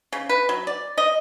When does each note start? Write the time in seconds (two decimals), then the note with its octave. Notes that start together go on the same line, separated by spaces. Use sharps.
0.13 C#3
0.29 B4
0.49 F#3
0.67 D5
0.98 D#5